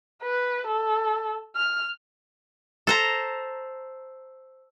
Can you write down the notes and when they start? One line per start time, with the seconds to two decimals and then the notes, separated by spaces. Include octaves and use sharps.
0.23 B4
0.67 A4
1.56 F6
2.87 A4 C5 A#5